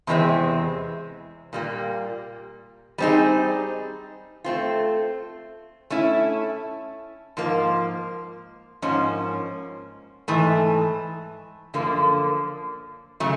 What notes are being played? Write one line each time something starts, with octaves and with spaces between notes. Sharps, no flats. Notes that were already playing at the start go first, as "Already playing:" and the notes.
E2 C3 E3 G#3 C4
A#2 G3 A#3
G3 C4 D#4 G#4
A3 C4 F4
A3 C#4 E4
G#2 F3 A#3
G#2 F3 A#3 C#4
G#2 E3 A3
F#2 D3 F3 A#3
C#3 F#3 A3